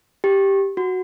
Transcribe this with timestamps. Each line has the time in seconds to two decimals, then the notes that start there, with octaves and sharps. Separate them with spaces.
0.24 G4
0.77 F#4